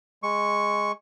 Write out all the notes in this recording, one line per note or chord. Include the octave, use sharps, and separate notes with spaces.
G#3 C#6